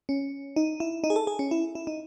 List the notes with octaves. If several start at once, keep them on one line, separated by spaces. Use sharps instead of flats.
C#4
D#4
E4
D#4
G#4
A4
G#4
C#4
E4
E4
D#4